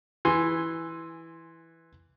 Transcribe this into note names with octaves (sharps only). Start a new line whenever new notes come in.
E3 G#5 C6